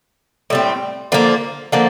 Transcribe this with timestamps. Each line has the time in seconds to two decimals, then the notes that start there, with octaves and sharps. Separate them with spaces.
0.50 A2 G3 C4
1.12 D3 F3 A#3
1.72 D3 F3 A#3